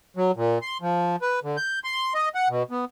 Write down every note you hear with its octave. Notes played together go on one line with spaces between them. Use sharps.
F#3
A#2
C6
F3
B4
D3
G6
C6
D#5
F#5
B2
B3